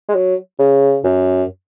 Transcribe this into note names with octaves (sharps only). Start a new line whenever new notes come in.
G#3
F#3
C#3
F#2